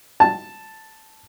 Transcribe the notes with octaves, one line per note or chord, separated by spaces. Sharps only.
A5